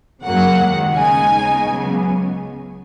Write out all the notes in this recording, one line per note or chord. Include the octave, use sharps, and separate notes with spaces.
F#2 C#3 F#3 A#3 F#5
D#2 D#3 G#3
C#3 G#3 D#4 G#5
C#3 G#3 B3 D#4
C#2 C#3 F#3 B3